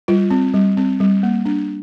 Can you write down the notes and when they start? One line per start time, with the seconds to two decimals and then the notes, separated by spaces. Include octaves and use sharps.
0.08 G3 F4
0.31 C4
0.54 G3
0.77 C4
1.00 G3
1.23 A#3
1.45 D4